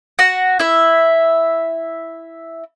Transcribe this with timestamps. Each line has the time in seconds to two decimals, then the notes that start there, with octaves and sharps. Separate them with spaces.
0.19 F#4 F#5
0.59 E4 E5